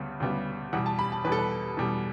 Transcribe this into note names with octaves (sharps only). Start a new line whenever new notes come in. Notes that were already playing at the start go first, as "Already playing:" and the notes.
Already playing: D2 C#3 G3 B3
D2 C#3 G3 B3
E2 B2 G3 F#5
A5
B5
A5
E2 B2 G3 B4
A4
B4
E2 B2 G3